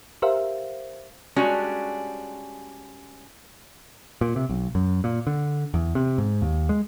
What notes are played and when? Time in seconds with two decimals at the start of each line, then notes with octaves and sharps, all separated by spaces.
0.22 G4 A#4 C5 E5 F5
1.36 G3 G#3 C#4 D4 F#4
4.21 A#2
4.36 C3
4.49 B1
4.75 F#2
5.04 A#2
5.27 D3
5.74 E2
5.95 C3
6.18 G#2
6.42 D#2
6.69 G#3